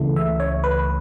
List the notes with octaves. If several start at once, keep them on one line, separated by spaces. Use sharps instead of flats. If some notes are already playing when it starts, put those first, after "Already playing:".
Already playing: C#2 C#3 E3 A3
E5
C#5
B4